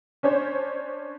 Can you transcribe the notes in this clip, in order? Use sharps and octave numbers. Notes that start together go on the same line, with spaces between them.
C#4 D4 C5 C#5